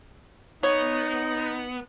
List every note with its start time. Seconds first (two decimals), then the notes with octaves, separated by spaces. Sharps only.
0.63 B3 D#4 C#5